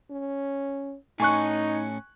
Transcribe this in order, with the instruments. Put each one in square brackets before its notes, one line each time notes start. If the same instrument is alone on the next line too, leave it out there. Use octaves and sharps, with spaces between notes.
[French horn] C#4
[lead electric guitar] A2 C#4 [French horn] D#4 [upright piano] G#5 C#6 F#6